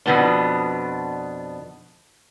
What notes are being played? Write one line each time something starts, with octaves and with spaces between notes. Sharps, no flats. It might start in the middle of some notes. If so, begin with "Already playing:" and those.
F2 G#2 B2 B3 D4